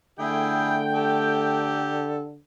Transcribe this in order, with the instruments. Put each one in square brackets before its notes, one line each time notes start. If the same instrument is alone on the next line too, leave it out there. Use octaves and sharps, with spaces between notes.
[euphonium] D3 [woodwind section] A3 G5 [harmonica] E4 G#4
[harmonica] G4 A4